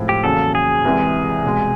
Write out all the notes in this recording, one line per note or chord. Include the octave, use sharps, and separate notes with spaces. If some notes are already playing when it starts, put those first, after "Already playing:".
Already playing: A2 F3 G#3 C4 E4
G4
E2 C#3 F#3 A#3 A4
G#4
C2 C3 E3 G#3
C2 B2 G#3